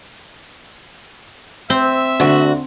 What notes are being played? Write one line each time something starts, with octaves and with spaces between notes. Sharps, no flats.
C4 E5
D2 D3 F#4